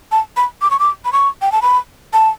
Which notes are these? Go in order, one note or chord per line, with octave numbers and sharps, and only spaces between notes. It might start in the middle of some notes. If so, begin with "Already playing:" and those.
A5
B5
D6
C#6
D6
B5
C#6
G5
A5
B5
A5